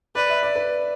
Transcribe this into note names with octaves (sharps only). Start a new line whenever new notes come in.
B4 D5
E5
D5
B4